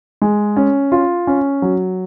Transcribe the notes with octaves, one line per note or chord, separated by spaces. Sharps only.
G#3
C#4
F4
C#4
F#3